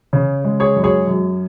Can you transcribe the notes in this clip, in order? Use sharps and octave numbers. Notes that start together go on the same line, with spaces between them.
C#3 G#4
G#3
G#4 C#5
F#2
G#4 C#5
F#2